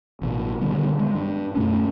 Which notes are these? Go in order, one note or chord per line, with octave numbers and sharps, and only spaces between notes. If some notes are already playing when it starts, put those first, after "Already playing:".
A1 B2
D3 D#3 G3 B3
G#3 B3
G2
F#2 B2 A3 C#4